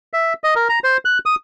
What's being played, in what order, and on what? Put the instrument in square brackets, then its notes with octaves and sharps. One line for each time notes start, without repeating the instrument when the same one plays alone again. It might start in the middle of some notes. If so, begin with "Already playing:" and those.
[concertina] E5
D#5
A#4
A#5
C5
F#6
D#6